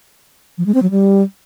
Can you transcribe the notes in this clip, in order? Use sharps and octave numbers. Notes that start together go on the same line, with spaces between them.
F3
G#3
C4
F#3
G3